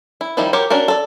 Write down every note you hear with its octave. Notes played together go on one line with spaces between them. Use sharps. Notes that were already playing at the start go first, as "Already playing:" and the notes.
E4
D#3 F3 G3 D#4 E4
F#4 G4 A#4 C#5
C#4 D4 F#4 A#4
A4 D5